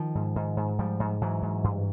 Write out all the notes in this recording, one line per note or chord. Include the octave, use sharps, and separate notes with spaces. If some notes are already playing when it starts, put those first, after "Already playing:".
Already playing: D#3 F3
G#2
G#2
G#2
G#2 F3 G3
G#2
G#2 E3 F#3
G#2
G2